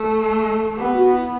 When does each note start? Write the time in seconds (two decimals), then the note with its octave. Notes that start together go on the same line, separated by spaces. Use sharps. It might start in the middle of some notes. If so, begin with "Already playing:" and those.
Already playing: A3 A4
0.77 B3 G4
0.95 F#4
1.13 E4